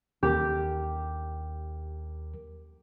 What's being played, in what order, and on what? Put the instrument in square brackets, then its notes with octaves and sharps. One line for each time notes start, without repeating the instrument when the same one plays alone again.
[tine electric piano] D#2 A#4 [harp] G4